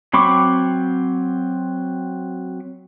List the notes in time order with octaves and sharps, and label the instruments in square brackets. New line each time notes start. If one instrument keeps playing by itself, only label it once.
[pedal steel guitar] F#3 C4 B5 C#6 D6